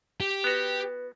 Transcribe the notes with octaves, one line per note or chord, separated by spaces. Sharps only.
G4
B3 F#4 B4